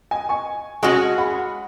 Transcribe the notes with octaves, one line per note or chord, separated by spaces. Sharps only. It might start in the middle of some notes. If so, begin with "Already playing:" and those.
D#5 G#5
G#5 C#6
G#3 C#4 F#4 G#5 C#6
F#5 B5